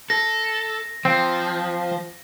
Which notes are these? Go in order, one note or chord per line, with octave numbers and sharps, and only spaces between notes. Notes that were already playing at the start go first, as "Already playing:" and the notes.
A4 A#6
F3 C4